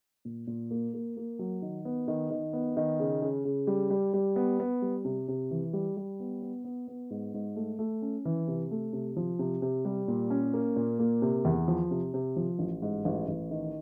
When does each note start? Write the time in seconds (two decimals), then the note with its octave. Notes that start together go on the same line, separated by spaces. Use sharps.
0.25 A#2
0.47 A#2
0.71 A#3
0.94 A#3
1.17 A#3
1.39 F#3
1.62 D#3
1.85 B3
2.08 D#3
2.30 D#3
2.53 B3
2.77 D#3
2.99 C#3
3.22 C#3
3.45 C#3
3.67 G3
3.90 G3
4.14 G3
4.36 B3
4.59 B3
4.82 G3
5.05 C3
5.28 C3
5.51 E3
5.73 G3
5.97 G3
6.20 B3
6.42 B3
6.64 B3
6.88 B3
7.10 G#2
7.34 G#2
7.56 A3
7.79 A3
8.02 C#4
8.25 E3
8.48 C3
8.71 A3
8.93 C3
9.17 F3
9.39 C3
9.62 C3
9.85 G3
10.08 A#2
10.30 C#4
10.53 A#3
10.76 A#2
10.99 A#3
11.22 C3
11.45 E2
11.68 F3
11.91 C3
12.14 C3
12.37 F3
12.59 A1
12.82 G#2
13.05 A1
13.28 A1
13.51 D#3